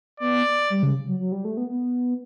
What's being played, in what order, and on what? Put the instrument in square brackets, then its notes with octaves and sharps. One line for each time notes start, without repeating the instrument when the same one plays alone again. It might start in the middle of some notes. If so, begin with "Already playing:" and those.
[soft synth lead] B3 [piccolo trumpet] D5
[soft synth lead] G3
C#3
F#3
F#3
G3
A3
B3
B3